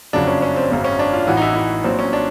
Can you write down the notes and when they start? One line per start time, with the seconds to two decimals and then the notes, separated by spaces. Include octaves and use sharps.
0.13 F#1 F2 C#3 F#3 D4
0.27 C#4
0.42 C#4
0.56 C4
0.70 G#1 F#2 C#3 F#3 C4
0.84 C#4
0.99 D4
1.13 F4
1.27 A1 A2 E3 F#4
1.37 D#4
1.42 E4
1.56 E4
1.84 A#1 A#2 F#3 C4
1.99 C#4
2.13 D4